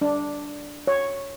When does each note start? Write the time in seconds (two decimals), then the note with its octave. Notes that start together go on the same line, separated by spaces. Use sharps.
0.01 D4
0.87 C#5